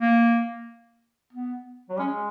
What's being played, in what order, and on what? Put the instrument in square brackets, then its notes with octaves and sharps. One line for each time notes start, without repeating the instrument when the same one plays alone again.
[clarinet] A#3
B3
[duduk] F#3
[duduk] G#3 [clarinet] C#4